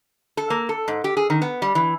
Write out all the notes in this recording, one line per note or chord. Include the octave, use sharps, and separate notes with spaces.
A4
A#3
A4
G#2
G4
G#4
D#3
B3
G3
E3